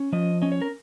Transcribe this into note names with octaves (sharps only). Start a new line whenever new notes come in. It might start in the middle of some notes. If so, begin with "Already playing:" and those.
Already playing: C#4
F3 D#5
C#4 D#5
C#5
A#4